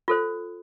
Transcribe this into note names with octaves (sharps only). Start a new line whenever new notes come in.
F4 A4 C5